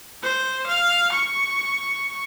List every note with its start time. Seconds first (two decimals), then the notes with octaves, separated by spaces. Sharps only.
0.23 C5
0.67 F5
1.13 C#6